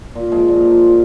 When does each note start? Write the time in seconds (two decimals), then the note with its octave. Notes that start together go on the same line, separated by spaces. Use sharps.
0.15 A#2
0.32 F3 G#3
0.48 A#2
0.65 F3